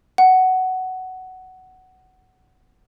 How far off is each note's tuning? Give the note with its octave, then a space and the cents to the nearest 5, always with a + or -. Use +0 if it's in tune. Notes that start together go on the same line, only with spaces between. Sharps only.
F#5 +10